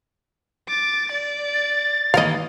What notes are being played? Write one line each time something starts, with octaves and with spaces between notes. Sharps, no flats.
D6 A6
D5
A6
D#3 E3 A#3 D#5 F5